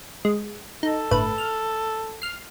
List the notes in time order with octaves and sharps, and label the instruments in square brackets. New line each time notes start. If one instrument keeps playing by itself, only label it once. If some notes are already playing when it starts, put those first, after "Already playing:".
[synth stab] G#3
[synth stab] D#4 [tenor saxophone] A4
[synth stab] G1 A2 B4
F6
F6 C7